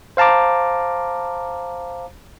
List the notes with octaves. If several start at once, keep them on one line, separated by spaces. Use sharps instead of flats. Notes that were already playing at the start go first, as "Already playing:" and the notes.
C5 F5 A5 A#5 D6